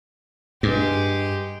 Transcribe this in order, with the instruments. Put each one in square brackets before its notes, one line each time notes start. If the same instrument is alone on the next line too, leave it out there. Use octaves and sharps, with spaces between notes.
[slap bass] G2 [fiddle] G#3 G4